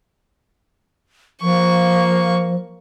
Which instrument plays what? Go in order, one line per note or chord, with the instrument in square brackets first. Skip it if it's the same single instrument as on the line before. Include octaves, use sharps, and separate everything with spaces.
[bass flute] F3 [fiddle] A#3 C#6